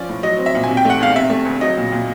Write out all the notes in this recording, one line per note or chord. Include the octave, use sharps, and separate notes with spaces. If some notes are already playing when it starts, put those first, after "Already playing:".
Already playing: F3 C#4 D5
A2
F#3 D#5
C4
E5
A#2
G#5
C3
G5
A3 F#5
E2 F5
C3 E5
A3
D2
F#3 D#5
A#2
A#2